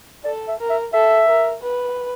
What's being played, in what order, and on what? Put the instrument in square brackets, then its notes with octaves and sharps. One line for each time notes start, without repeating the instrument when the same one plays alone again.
[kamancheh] A4 [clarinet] D5
[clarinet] E5
[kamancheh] A#4
[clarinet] E5
[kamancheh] A4 [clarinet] E5
[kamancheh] A#4
B4